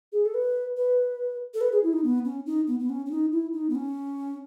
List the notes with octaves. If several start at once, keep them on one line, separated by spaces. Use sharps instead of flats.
G#4
A4
B4
B4
A4
B4
G#4
E4
D#4
B3
C#4
D#4
B3
B3
C#4
C#4
D#4
E4
D#4
B3
C#4